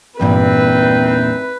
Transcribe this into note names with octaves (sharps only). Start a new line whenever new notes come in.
E2 G2 A#2 D#3 E3 C4 B4